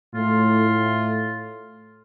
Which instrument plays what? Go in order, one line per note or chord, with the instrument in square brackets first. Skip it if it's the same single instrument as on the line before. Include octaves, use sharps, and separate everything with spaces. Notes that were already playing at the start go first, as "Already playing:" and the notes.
[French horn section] A2 A3 [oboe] F4